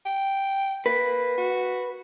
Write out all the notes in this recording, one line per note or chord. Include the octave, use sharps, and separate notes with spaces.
G5
A#3 B4
F#4